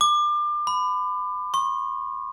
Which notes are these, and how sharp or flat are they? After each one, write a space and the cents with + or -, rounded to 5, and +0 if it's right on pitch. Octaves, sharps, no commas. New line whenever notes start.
D6 +30
B5 +30
C#6 -40